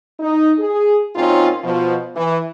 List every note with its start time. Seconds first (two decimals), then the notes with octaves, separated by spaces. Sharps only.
0.19 D#4
0.58 G#4
1.15 A#2 F#3 C4 C#4 D#4 F4
1.63 B2 F3
2.16 E3